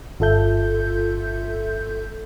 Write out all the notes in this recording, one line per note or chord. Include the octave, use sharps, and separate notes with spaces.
G1 F4 A4 E5 G6